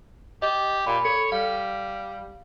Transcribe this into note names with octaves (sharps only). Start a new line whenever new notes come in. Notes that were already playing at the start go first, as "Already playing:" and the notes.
G4 D#5
A#2 B5
A4 C#5
G3 F5